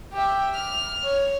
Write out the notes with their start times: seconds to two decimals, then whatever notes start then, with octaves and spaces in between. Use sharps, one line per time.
0.13 G4 E5
0.55 F6
1.03 C#5